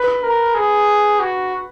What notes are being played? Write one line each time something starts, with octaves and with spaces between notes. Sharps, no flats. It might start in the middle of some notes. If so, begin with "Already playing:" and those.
Already playing: B4
A#4
G#4
F#4